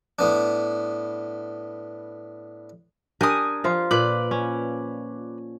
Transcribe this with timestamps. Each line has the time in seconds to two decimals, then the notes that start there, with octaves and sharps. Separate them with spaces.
0.19 A2 B3 D4
3.21 D4 G4 A#4 G#5 D#6
3.64 F3 F4
3.91 A#2 B4 D5
4.31 C#4